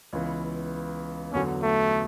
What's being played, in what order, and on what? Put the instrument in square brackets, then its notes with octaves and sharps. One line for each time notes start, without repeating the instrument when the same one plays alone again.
[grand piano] C#2 C#3 E3 B3
[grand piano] E2 D3 F#3 [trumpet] C#4
[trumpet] A3